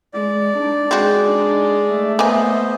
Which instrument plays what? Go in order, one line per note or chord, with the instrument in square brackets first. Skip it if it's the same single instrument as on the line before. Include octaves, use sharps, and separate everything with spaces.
[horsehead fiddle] G#3 [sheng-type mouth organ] D5
[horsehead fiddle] D4 D#4
[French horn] G#3 [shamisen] C4 F#4 [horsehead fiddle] G#4
[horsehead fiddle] D4 D#4
A3 E5
[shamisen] A#3 G#5 [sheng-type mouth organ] B3 C5 D#5